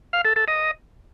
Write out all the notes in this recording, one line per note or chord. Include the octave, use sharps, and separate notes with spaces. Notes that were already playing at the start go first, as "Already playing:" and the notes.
F5
A4
A4
D#5